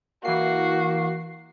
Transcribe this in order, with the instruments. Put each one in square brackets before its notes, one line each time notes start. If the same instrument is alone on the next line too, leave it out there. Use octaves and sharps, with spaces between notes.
[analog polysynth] E3 C7 [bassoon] A#3 [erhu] F#4